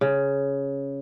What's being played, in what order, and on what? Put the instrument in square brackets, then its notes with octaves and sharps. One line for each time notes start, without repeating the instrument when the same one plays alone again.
[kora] C#3